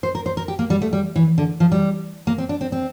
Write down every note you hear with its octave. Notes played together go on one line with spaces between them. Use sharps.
C5
A#4
C5
A#4
G4
A#3
G3
A3
G3
E3
D3
F3
G3
A#3
C4
D4
C4
C4